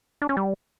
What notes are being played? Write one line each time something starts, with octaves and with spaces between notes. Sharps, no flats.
D4
C#4
G3